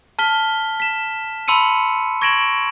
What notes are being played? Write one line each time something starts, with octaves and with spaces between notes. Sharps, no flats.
A5 F6 B6 G7
B6 E7
A5 B5 C6 E6 C#7 D#7
C#6 G#6 A#6 D7 E7 F#7